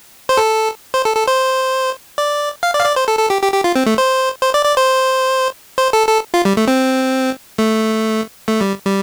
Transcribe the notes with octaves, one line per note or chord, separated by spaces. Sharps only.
C5
A4
C5
A4
A4
C5
D5
F5
D5
F5
D5
C5
A4
A4
G4
G4
G4
F4
C4
A3
C5
C5
D5
D5
C5
C5
A4
A4
F4
G3
A3
C4
A3
A3
G3
G3